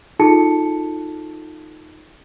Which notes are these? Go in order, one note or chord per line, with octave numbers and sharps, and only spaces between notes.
D#4 F4 G#4 A4 A5 C#7